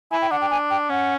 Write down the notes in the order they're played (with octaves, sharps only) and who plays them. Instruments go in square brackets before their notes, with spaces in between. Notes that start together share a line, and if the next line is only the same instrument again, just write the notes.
[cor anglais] E4 [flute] G#5
[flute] G5
[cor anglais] D4 [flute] F#5
[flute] G5
G#5
G5
[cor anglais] C#4 [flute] F#5